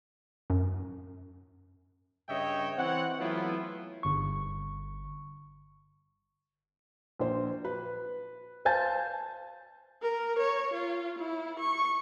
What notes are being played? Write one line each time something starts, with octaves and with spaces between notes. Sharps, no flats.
F#2
G2 C#3 C#5 D#5 E5 G5
E3 C4 C#5 F#5
E3 F#3 A3 B3 E4 F4
G1 C#6
A#1 C5
B4
C5 F5 G#5 A5 G6 A6
A#4
C#5
F4
E4
C#6